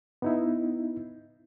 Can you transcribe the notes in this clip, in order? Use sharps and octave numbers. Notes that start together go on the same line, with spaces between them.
B3 D#4 E4